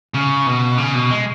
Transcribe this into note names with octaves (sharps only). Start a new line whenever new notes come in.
C#3
B2
C#3
B2
G#3